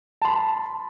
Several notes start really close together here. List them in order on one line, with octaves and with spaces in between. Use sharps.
A5 C6 B5